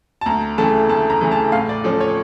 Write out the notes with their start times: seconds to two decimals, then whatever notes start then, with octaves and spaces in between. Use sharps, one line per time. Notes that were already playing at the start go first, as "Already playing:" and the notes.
0.21 A5
0.26 D2 A#5
0.58 C#3 E3 A3 A5
0.89 D2 A5
1.10 A#5
1.21 C#3 E3 A3
1.32 A5
1.52 A2 F5
1.69 D5
1.84 F3 C#4 A4
2.01 C#5